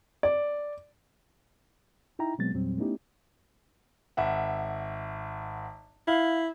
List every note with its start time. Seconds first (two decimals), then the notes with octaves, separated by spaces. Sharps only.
0.23 D5
2.19 D#4 E4 E5 G5 A#5
2.38 B2 F#3 G#3 B3 C4 A6
2.53 E2 A#2 F#3 G3 C4
2.78 A3 B3 C#4 D#4 E4 G4
4.17 G#1 E5 F#5
6.08 E4 F5